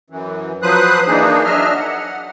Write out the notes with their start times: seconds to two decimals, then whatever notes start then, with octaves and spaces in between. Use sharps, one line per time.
0.10 F#2 E3
0.63 F3 F#3 B4 C5 D#6 F#6
1.08 E3 A#3 D4 D#4 G#4
1.45 F#3 D4 D#5 E5 F6
1.76 F#5